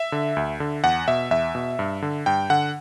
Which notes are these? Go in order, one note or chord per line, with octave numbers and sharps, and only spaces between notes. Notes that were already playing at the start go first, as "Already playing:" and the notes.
Already playing: E5
D3
D2
D3
E2 F#5
B2 E5
E2 E5
B2
G2
D3
G2 G5
D3 F#5